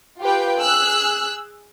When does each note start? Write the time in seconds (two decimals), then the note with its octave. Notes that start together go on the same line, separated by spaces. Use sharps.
0.20 F4 G4 B4 G5
0.60 G#4 E6 F#6